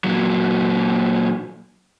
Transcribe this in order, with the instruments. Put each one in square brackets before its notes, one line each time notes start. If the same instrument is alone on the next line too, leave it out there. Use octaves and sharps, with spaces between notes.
[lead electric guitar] A#2 F#3